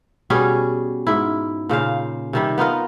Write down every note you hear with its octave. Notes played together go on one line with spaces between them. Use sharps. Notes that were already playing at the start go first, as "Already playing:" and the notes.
B2 G3 C#4 G#4
G#2 E4
A#2 C#3 C5 F5
C3 D#3 G3
B3 D#4 F4 A#4